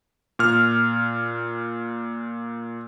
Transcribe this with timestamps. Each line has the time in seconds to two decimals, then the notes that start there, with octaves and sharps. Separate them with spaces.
0.39 A#2 F6